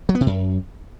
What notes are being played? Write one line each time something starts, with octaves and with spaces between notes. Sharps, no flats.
F#3
B3
C3
F#2